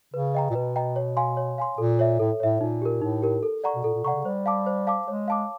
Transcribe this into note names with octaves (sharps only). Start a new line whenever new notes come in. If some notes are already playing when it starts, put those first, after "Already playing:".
C#3 B4
D#5 G5 A#5
A#2
B2 B4
D#5 G5 A#5
C#5
F5 G#5 C6
C#5
F5 G#5 C6
A#2 A4
C#5 E5
A2 A4
A2 C#5 E5
A#2 D#4
G4 A#4
A2 D#4
G4 A#4
A4
D5 F#5 A#5 C#6
B2
A#2 A4
A#2
C3 D5 F#5 A#5 C#6
C#3
G3 C5
F5 A5 D6
C5
F5 A5 D6
G#3 C#5
F5 A5 D6